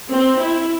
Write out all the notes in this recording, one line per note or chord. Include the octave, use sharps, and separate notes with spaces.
C4
E4